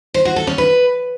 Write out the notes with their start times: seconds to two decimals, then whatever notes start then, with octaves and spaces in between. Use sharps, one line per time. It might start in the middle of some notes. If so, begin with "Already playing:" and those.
0.14 C5
0.25 F#4
0.36 A4
0.47 C#4
0.58 B4